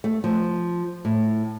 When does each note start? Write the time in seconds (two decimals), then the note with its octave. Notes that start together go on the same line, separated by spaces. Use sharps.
0.04 A3
0.24 F3
1.05 A2